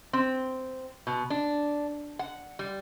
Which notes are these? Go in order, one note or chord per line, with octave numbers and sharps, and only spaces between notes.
C4
B2
D4
F#5
G3